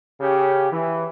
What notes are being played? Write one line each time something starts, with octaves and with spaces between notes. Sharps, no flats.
C#3 C#4 G4
E3